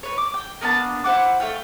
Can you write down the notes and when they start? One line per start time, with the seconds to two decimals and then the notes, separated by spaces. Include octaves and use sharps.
0.03 B4 C#5
0.18 D6
0.34 G5
0.61 A#3 B3 D4 A5
1.04 E4 C5 F#5 D6
1.40 A3 F5 G5